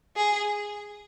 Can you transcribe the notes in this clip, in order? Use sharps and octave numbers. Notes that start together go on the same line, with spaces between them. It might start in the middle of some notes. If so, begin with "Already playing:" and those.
G#4